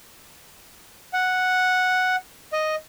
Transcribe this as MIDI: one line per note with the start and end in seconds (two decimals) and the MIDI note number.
1.13 2.16 78
2.53 2.75 75